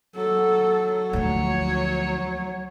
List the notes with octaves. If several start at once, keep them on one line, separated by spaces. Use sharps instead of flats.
F#3 A4
D2 F3 C#5